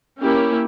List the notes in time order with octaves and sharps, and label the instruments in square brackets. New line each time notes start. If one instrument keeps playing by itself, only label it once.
[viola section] A#3 C#4 E4 G4